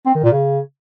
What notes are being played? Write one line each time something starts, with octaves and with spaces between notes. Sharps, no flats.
C4
D#3
A#2
C#3